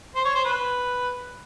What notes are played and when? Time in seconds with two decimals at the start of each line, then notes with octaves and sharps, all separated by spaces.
0.15 C5
0.25 C#5
0.35 C5
0.45 B4